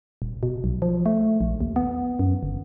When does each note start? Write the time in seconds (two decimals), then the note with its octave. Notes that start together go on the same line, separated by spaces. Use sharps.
0.22 D#1
0.43 B2
0.64 B1
0.82 F3
1.06 A3
1.41 A#1
1.61 D#2
1.76 B3
2.19 F#2
2.43 G1